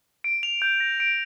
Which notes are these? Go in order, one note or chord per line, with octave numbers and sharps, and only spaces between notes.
D7
F7
G6
A#6
D7